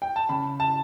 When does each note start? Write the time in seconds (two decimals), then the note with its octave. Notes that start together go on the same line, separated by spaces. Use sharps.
0.02 G5
0.16 A5
0.29 C#3 B5
0.60 A5